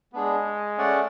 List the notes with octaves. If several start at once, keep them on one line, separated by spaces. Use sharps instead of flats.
G#3 B3 D4 G#4
A3 C#4 G#4 D5 F#5